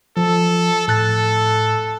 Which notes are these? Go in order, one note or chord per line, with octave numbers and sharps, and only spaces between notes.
F3 A4
A2 A4 F#6 A6